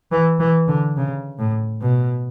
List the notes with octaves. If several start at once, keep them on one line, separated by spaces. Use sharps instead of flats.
E3
E3
D3
C#3
A2
B2